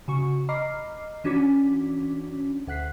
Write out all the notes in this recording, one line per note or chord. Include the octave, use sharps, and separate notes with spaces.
C#3 F#4 C#6
D#5 A#5 B5 D6 F6 C7
E3 C#4 D4 F#4 D6 B6
D2 F#5 F#6 B6 C7